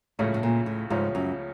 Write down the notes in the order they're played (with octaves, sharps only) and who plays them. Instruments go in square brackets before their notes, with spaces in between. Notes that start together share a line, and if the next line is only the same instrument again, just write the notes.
[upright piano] C#2 C#3 F3 A3 C#4 [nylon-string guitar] A2
[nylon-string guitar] A2
A#2
A2
[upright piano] C#2 C#3 F3 A3 C#4 [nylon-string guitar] G#2
[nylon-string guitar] F#2